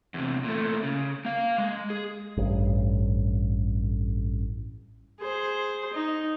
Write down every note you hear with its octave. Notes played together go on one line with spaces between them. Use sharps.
E2 C3
A#2 A3
C#3
A#3 F5
G#3
G#4
A1 G2
G#4 C5
D#4